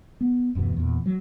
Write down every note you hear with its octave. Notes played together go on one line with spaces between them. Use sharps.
B3
D1 F#2 B2 E3
E2 A#2
F#3